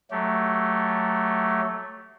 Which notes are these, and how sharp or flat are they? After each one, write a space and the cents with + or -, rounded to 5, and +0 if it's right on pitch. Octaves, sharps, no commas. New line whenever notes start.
F#3 +5 A3 +0 G4 -15